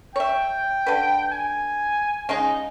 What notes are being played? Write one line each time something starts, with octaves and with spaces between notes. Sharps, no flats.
C#5 E5 G5
D3 B4
G#5
C#3 G#3 D#4